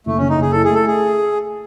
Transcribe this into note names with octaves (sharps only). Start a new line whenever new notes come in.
F#1 A3
C#3 C#4
D#4
F#1 G#4
E4 A4
A3 G#4
A4
A3 G#4